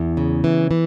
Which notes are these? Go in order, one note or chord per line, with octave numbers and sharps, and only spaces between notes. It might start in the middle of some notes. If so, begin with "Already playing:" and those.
Already playing: E2
C#3
E3
E3